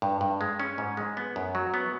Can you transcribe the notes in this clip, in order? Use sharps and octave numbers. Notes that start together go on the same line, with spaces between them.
G2
G2
G#3
C#4
G#2
G#3
B3
F#2
F#3
B3